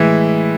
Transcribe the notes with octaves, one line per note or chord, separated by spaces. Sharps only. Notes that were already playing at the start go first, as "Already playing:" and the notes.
Already playing: A2 E3 G#3 E4